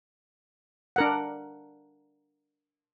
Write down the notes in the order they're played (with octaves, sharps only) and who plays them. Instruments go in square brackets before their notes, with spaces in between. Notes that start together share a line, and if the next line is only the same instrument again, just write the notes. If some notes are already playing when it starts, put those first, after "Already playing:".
[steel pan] D4 A#4 F#5